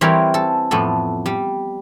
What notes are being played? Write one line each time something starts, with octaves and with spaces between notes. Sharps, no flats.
E3 G3 C4 G4 A#4 C#5
A4
F2 A2 B3 A4
G3